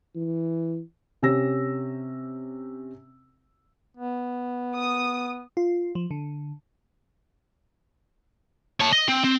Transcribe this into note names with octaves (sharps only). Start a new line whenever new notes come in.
E3
C3 C#4 G4 E6 A#6
B3
D#6
F4
F3
D3
C#5 A5
D#5
C4
C4